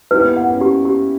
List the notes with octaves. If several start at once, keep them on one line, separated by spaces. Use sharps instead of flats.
E4 G4 B4
B3
A#3
B3 F#5
A#3 C#4
G4
G4